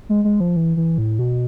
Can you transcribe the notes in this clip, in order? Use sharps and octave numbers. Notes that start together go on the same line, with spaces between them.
G#3
G#3
F3
E3
E3
A2
B2